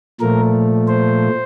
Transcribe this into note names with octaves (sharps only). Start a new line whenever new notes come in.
A#2 F3 A3 A#4
C5